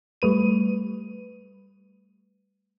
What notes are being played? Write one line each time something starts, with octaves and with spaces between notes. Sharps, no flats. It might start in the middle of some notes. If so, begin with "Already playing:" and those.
G3 A3 B4 D#7